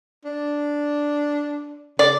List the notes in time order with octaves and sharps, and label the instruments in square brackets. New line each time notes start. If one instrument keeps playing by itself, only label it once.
[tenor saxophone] D4
[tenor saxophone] C#3 [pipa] D5